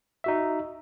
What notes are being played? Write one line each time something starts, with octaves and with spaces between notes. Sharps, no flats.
D#4 F#4 E5